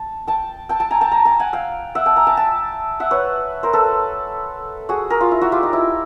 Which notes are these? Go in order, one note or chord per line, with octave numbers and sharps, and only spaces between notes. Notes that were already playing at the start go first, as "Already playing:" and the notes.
Already playing: A5
G5 A5
G5 A5
G5 A5
G#5 A#5
G5 A5
G#5 A#5
G5 A5
F#5 G#5
F5 G5
E5 F#5
G5 A5
G#5 A#5
G5 A5
G5 A5
E5 F#5
B4 C#5
A#4 C5
A4 B4
F#4 G#4
G#4 A#4
F4
E4
E4 F#4
F4 G4
D#4
E4